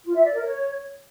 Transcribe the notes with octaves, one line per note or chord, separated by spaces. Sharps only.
F4
E5
D5
A#4
C#5